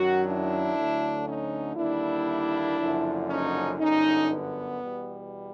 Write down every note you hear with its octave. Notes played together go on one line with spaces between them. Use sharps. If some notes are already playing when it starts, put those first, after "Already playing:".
Already playing: F#2 D#3 F#3 F#4
D4 E4
D2 D3 F#3 A3
C#4 D#4
D#2 D3 G3 A#3 D4 E4
F#1 F#2 D3 F3
C#4 D#4
G1 F#2 D3 C#4 D#4
B3
E2 B2 G3